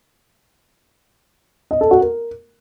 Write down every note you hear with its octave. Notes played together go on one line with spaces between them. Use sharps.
D#5
A4
F#4
A#4